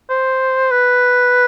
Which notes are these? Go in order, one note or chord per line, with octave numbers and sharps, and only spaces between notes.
C5
B4